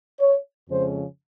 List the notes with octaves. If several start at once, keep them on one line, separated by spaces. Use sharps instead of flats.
C#5
F2 C#3 F3 G#3 C5